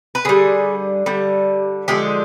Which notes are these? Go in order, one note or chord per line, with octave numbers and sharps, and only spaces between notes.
B4
D3 G3 G#4
D3 G3
D3 F3 G#3 G4